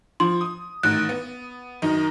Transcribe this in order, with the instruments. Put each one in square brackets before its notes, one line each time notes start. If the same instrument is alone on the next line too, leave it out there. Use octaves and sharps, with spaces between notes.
[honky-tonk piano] F3 [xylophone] C6
[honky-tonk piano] D#6
[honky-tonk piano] A1 D#3 [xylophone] F#6
[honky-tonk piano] B3
F#2 D#3 D#4